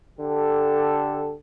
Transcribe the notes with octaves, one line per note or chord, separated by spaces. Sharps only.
D3 G4 A4